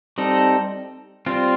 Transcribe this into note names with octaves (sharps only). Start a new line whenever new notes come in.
G3 C4 D#4 A4 D#5
G3 C4 F4